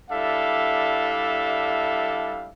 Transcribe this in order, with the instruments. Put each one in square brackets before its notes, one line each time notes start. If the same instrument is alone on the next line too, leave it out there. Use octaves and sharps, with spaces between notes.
[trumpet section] G3 D4 E4 A4 E5 F5